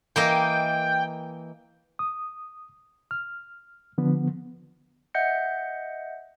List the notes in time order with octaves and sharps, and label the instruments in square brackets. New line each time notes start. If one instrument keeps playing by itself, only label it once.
[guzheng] E3 A#3 D#5 [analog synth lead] G5
[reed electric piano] D#6
F6
D3 F3 B3
[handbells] D#5 E5 F#5 G6 A#6 C#7